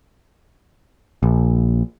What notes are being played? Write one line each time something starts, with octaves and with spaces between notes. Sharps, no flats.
A#1